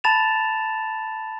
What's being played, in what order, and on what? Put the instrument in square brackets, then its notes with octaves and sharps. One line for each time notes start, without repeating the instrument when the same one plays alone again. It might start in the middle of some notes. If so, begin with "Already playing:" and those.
[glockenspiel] A5 B5 A6 E7 F7